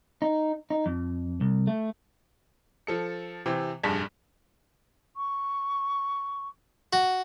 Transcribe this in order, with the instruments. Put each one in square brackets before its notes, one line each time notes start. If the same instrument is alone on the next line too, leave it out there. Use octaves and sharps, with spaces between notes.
[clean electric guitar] D#4
D#4
F2
C2
A3
[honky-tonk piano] F3 A4 C#7
C3 E3 C4
F1 A#1 G2 G#4 A5 B6
[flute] C#6
[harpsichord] F#4